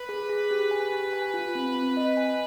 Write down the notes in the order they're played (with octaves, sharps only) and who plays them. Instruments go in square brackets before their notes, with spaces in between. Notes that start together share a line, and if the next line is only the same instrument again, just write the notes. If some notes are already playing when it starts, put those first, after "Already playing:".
Already playing: [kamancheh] B4
[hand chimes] G#4
G#4
G4
G#5
G4
G#5
F4
C4
C4
D#5
G#5